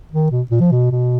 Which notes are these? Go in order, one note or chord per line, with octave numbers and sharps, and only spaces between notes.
D#3
B2
A#2
F3
B2
B2